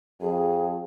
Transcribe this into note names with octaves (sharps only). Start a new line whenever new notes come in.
F2 G#4